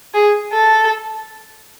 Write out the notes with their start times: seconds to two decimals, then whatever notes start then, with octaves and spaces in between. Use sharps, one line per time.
0.14 G#4
0.53 A4